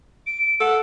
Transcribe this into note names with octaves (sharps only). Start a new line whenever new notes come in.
D7
A4 F#5